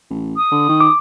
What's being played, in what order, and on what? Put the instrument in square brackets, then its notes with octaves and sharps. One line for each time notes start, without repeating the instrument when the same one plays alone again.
[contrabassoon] A1
[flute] D#6
[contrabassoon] D3
D#3
[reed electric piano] D6